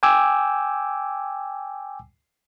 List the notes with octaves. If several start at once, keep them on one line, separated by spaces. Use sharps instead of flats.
G5 G#5 D6 E6